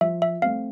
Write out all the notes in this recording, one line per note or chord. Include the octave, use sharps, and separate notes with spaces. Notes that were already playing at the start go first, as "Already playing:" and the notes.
F3 E5
E5
A3 C4 F5